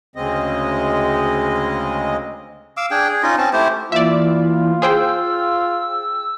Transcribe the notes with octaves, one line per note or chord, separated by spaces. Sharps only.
D2 C#3 G#3 C4 D#5
F5 D6 E6
D4 G#4 G5
G#4
C#4 D#4 F4 D#5
C4 C#4 A5
A3 E4 G4 C5
E3 A#3 E4 F4 D5 E5
G#4 C5 G5 E6